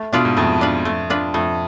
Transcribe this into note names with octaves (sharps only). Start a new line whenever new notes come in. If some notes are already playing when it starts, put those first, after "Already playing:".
Already playing: A3
B2 D4 F4 B4
G#2
F2 A3
D4 F4 B4
A3
D4 F4 B4
F2 A3